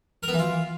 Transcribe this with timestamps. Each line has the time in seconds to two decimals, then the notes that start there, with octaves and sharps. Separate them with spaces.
0.23 A#4
0.28 B3
0.33 E3
0.39 F4